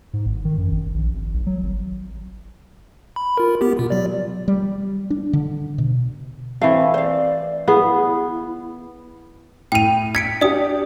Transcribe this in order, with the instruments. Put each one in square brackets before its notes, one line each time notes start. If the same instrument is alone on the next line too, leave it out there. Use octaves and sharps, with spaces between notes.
[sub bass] G#2
G#1
D#3
F#2
G#1
A#1
G#1
B1
F#3
G#1
[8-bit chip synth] B5
F4 A#4
B3 G4
B2 F4
F#3 D5
[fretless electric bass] G3
D4
D3
B2
[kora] E3 A3 [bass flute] C4 [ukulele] F5
[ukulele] C5 F5 [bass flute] D5
[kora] B3 [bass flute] E4 [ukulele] G#4
[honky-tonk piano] A2 F7 [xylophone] G5 D#7
[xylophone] G#6 C#7 D7 [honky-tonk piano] B6
[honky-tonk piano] D4 G4 [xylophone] D5 D#6